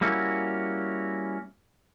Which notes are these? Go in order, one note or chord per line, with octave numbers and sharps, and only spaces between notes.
G3 A#3 C#4 E4 F#4